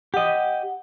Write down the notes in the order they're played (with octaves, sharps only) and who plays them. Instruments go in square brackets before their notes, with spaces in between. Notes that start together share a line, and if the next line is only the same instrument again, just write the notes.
[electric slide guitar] G4 D#5 [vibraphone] F#5